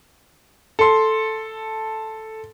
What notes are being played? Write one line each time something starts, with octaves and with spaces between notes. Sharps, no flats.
A4 C6